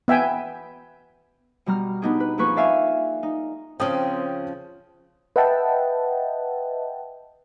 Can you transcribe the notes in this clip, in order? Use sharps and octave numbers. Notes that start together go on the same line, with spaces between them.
B3 E5 G5 G#5
B2 G3 A#5 F6
B3 D4 D#4 G4 G#4
B4
F2 A#3 G#4 B4 C#6
D5 E5 F5 G#5
D#4
C#3 F3 C4 G5 D#6
B4 D#5 E5 F#5 G5 A5